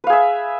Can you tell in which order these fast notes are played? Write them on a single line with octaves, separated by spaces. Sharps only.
B4 F5 G#4 E5